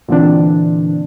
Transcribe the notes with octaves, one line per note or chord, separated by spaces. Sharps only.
A#2 D3 E3 C4 D4